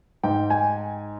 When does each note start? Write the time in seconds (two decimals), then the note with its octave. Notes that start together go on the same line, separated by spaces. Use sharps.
0.23 G#2 G5
0.50 G#5